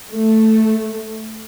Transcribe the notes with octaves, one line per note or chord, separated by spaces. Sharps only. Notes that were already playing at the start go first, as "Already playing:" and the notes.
A3